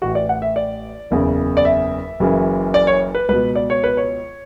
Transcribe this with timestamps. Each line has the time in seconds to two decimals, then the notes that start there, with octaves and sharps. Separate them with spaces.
0.02 A1 A2 E3 F#4
0.15 D5
0.29 F#5
0.42 E5
0.56 D5
1.11 F#1 E2 C#3
1.57 D5
1.65 E5
2.20 F#1 F#2 C#3 E3
2.74 D5
2.87 C#5
3.15 B4
3.29 C#2 B2 B4
3.55 D5
3.70 C#5
3.84 B4
3.97 C#5